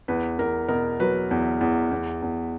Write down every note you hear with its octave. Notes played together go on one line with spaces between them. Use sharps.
E2 B4
E2 A#4
B2 A#4
F#3 B4
E2
E2
E2
E2